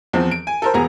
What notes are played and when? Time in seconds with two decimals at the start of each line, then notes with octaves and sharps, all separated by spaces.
0.13 E2 F3 C4
0.31 D7
0.47 G#5
0.62 A4 A#4 C5
0.74 E1 B3 G#4 A#5